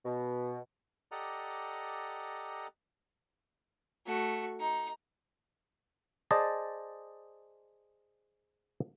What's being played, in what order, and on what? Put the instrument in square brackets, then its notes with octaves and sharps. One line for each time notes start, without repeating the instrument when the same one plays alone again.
[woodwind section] B2
[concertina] G4 A4 D5 D#5 F#5 A#5
[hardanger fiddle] A3 F#4
D#4 A#5
[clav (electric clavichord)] G#4 C5 D5 D#5 A5